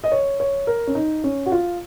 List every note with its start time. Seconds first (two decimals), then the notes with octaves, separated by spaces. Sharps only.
0.04 D#5
0.12 C#5
0.40 C#5
0.67 A#4
0.87 C#4
0.95 D#4
1.24 C#4
1.46 F#4
1.52 F4